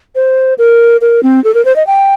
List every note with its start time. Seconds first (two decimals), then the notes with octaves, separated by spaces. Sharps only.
0.15 C5
0.58 A#4
1.01 A#4
1.23 C4
1.44 A4
1.54 A#4
1.65 C5
1.76 D#5
1.87 G5